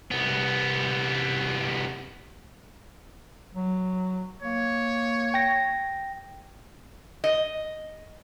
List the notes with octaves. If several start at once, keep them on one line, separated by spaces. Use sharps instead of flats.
C2 B3
F#3
A#3 C#5
G5 A#6
D#5